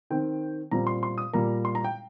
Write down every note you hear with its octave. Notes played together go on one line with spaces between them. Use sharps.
D#3 C4 G5
A#2 G3 C4 A#5
C6
C6
D#6
A#2 G3 A#3 A#5
C6
A#5
G5